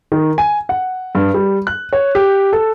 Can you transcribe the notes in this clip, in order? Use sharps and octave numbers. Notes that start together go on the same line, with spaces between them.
D#3
G#5
F#5
G2
G3
F#6
C#5
G4
A4